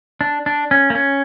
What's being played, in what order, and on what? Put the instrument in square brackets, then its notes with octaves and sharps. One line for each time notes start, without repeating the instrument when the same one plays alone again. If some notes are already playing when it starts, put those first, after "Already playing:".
[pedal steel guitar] D4
D4
C#4
A#3
C#4